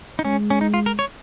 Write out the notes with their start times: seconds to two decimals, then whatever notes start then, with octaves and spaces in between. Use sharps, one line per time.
0.19 D#4
0.25 G#3 C#4
0.50 C#4
0.61 D#4
0.74 F4
0.86 A#4
0.99 C#5